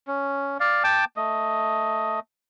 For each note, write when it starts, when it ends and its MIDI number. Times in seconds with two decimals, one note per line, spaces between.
0.07 0.58 61
0.60 0.83 74
0.60 0.83 77
0.84 1.05 79
0.84 1.05 81
0.84 1.05 86
1.17 2.20 57
1.17 2.20 75